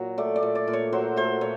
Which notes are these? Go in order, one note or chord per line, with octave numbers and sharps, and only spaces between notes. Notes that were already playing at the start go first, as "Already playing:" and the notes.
Already playing: A#2 F#3
A3 D5
D5
A#2
D5
A#2
C#5
F#3 C5
A3 C5
A#2 C#5